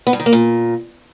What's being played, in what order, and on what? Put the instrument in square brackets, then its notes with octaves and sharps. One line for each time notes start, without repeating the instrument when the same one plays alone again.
[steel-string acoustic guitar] B3
G2
D#3
A#3
A#2